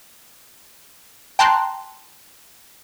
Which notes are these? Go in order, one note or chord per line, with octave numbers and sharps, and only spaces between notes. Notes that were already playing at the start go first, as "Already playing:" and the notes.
G5 A5 A#5 C6 F#6